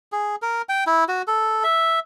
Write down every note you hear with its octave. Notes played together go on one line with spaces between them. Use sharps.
G#4
A#4
G5
E4
F#4
A4
E5